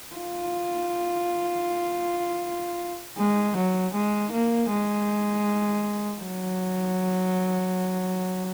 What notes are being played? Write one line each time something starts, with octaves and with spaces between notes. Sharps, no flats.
F4
G#3
F#3
G#3
A#3
G#3
F#3